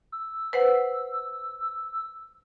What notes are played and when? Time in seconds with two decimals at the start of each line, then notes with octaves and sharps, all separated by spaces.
0.12 E6
0.53 B4 C5 F#5